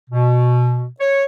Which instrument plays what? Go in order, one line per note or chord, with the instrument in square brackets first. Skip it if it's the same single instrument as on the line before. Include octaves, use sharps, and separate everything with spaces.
[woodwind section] B2
C#5